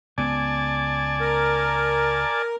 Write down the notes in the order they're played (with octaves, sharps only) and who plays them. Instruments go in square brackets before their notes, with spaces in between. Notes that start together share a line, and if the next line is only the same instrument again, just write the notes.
[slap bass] C#2 B3 [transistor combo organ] D5 G#5 A5
[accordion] A#4